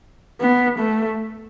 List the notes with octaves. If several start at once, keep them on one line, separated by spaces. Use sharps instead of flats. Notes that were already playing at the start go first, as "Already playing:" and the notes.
B3
A3